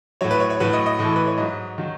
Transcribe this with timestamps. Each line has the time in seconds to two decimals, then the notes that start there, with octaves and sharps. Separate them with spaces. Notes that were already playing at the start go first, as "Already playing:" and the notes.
0.21 A2 F#3 C#5
0.31 B4
0.40 C#5
0.50 C#5
0.60 A2 F#3 B4
0.73 D#5
0.86 D#5
0.99 A2 E3
1.05 A4
1.16 B4
1.27 C#5
1.37 G#2 F#3 D#5
1.78 D#3 F#3